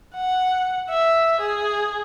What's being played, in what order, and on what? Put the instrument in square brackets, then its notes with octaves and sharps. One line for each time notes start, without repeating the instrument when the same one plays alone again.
[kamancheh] F#5
E5
G#4